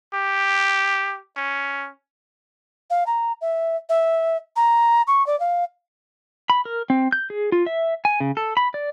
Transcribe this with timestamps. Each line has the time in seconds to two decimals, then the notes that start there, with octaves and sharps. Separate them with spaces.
0.14 G4
1.37 C#4
2.90 F5
3.07 A#5
3.41 E5
3.89 E5
4.56 A#5
5.07 C#6
5.27 D5
5.40 F5
6.50 B5
6.65 A#4
6.90 C4
7.12 G6
7.30 G#4
7.52 F4
7.66 E5
8.05 G#5
8.20 C#3
8.37 A4
8.57 B5
8.74 D5